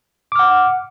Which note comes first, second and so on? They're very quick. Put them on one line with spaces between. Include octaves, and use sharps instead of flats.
D6 F6 F#5